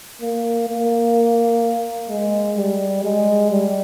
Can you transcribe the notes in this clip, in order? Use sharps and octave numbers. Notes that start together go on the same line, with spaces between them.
A#3
A#3
G#3
G3
G#3
G3